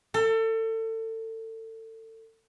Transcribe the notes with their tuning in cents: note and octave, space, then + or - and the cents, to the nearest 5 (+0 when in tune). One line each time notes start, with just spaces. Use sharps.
A4 +30